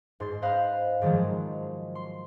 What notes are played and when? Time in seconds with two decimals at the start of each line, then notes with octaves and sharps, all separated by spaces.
0.20 G#2 C6 A6
0.42 C5 D#5 F5 B5 F#6
1.02 G#2 D#3 F3 F#3 G#3
1.95 C6